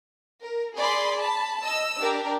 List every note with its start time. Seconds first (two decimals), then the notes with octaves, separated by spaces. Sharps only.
0.41 A#4
0.76 G#4 D5 B5 C6
1.19 A5 B5
1.64 D#5 E6
2.01 D4 G4 A#4